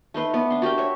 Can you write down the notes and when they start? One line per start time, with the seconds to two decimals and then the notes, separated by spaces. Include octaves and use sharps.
0.14 A3 D#4 B4 C6
0.34 B3 D5
0.50 D4 C6
0.62 F#4 G4 A#4 G5
0.78 C#5 E5